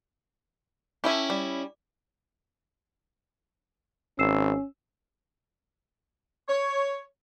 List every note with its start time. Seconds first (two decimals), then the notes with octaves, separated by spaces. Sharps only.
1.04 C#4 E4 G4 A4 E5
1.30 G3
4.19 G#1 C#4 E6 C7 E7
6.48 C#5